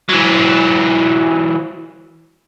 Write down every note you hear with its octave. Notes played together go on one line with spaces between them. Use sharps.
E3 F#3